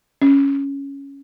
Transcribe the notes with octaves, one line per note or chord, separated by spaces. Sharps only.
C#4